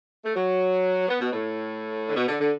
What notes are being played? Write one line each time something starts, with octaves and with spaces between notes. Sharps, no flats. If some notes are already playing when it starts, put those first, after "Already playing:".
A3
F#3
B3
B2
A2
D3
B2
D3
D3